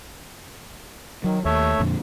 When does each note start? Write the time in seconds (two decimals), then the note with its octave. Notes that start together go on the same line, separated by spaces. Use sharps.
1.24 D#3 F#3
1.45 D#2 A3 C#5 E5
1.80 F2 A#2 D3